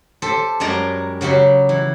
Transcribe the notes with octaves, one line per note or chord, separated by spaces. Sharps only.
G4 A4 C5
F#2 G3 G#3 D5 A#5
C#3 F#3 G4 F#5
E3